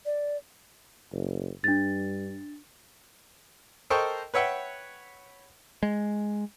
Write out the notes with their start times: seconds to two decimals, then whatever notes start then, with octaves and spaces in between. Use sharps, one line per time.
0.06 D5
1.12 F#1
1.64 G2 D4 A6
3.90 A4 A#4 C5 D#5 G5 C#6
4.34 B4 C#5 E5 F#5 G5
5.83 G#3